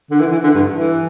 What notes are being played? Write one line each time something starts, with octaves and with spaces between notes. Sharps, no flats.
D3
E3
E3
D3
G2
E3